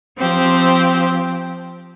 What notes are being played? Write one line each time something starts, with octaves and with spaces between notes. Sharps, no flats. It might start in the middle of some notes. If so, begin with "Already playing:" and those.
F3 C4 G4 C5